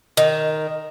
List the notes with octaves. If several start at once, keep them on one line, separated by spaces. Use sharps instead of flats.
D#3